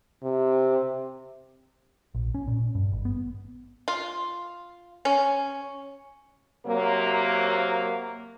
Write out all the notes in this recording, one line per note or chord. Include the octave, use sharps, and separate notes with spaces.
C3
A#1
C#4
A#2
G2
G#1
B3
F4
C#4
C3 F#3 A#3